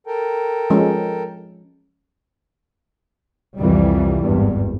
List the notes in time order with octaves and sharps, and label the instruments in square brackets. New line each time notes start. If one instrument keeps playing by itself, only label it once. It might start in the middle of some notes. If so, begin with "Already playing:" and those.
[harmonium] A4 A#4 G5
[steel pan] F3 G#3 C#4
[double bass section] C2 F2 E3 G3
G#1 E2 G2